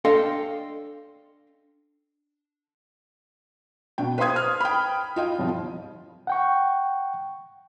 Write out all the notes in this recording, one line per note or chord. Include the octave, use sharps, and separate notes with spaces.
D4 A4 D#5 F5 G5 C6
B2 D4 G5
B4 C5 F5 C6 D#6 G#6
F6
G5 B5
F4 D#5 G5
G1 C2 F3
F#5 G5 C#6